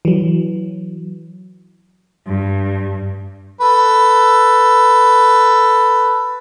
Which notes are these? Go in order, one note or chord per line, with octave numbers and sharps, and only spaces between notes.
E3 F#3
G2
A4 B4